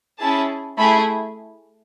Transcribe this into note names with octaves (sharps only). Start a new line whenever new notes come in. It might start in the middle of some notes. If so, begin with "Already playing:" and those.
C#4 E4 G#4 A5
A3 E4 G#4 B5